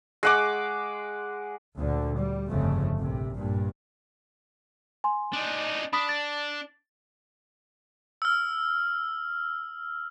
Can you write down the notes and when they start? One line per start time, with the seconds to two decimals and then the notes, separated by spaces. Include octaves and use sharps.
0.23 G#3 F#5 D6
1.79 D2 A#2 D3
2.19 G3
2.51 G1 F2 C#3 A3
2.97 A#1 C3
3.36 G2 A#2
5.04 G#5 C6
5.33 D4 D#4
5.93 D4 B5 D#6 B6
6.09 A6
8.22 E6 F6